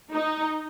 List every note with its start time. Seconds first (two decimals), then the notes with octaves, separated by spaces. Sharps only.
0.13 D#4